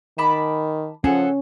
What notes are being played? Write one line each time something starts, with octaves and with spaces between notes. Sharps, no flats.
D#3 A5 B5 D6
F3 C#4 G#4 A4 F#5